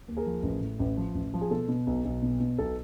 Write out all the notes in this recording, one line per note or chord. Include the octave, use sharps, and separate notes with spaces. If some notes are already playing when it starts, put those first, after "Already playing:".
D#2
G#4 A#4
F3
A1
A2
A1
F3
A1
F3
G#4
B2 A4
B2
B1
B1
B2
B2
B1 A4